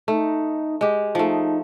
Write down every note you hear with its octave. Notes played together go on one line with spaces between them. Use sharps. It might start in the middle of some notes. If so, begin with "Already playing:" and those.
A3 D#4
G#3 G4
F3 A3 D#4